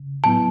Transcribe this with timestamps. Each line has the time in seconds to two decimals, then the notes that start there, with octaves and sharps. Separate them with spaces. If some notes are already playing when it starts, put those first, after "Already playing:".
Already playing: C#3
0.24 A2 F#3 B3 E4 A5